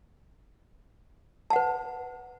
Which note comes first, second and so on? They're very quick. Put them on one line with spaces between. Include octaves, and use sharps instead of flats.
A5 F#5 B4